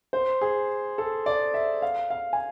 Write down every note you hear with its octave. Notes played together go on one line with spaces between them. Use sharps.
C5
G#4
A4
D5
E5
F5
F5
G#5